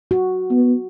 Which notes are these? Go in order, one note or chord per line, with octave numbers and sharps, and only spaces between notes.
F#4
B3